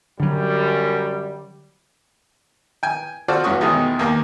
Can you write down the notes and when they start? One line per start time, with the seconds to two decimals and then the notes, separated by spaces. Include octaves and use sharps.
0.20 F#2 D3 F#3 G3
2.83 G5 G#5
3.28 F4 F#4 A4 C5 D5
3.44 E2 G2 C#4 F#4 C#6 D#6
3.61 E2 B2 D#3 G#3 A3 D#4
3.99 D#2 A#3 G5